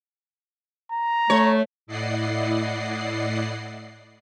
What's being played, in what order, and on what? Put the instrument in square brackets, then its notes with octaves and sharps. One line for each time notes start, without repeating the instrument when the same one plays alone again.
[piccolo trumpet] A#5
[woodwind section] A3 [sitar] C#5
[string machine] A2 E4 D5 D#5 F#5 C7